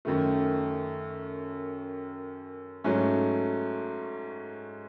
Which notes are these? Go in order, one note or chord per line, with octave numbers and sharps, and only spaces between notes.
F#2 D#3 A3
G#2 F#3 A3 C#4